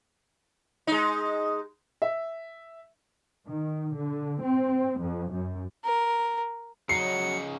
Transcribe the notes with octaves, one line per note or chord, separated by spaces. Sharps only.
G#3 D#4
E5
D#3
D3
C4
F2
F#2
A#4
C#3 F#3 D#4 C7 C#7